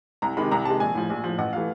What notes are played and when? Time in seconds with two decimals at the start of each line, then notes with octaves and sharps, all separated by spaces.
0.22 C2 A#5
0.37 C3 D#3 G#3 B5
0.51 C2 A#5
0.65 C3 D#3 G#3 A5
0.80 A#1 G#5
0.95 A2 F3
1.10 A#1
1.24 A2 F3
1.38 A1 F#5
1.53 E3 A3 F5